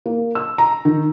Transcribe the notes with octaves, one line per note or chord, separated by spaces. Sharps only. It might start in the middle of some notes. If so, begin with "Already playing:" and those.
A#3
E6
A#5
D#3